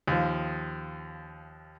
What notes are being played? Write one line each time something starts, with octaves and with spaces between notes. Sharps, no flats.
D#2 F3